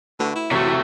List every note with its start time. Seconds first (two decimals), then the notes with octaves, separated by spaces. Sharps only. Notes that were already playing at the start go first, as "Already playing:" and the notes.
0.20 D3 A3 F#4 B4
0.36 E4
0.51 C3 E3 A3 F#4 A#4 C#5